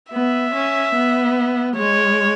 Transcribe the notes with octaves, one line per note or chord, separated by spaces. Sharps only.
B3 E5
C#4
B3
G#3 C#5